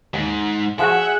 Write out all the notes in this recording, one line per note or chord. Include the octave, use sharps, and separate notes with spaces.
D#2 G#2
F3 F#4 G#4 E5 F#5